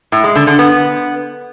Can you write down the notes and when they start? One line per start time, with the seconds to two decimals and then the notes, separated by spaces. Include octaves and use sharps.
0.12 A2
0.24 G#3
0.35 D3
0.47 D3
0.59 B3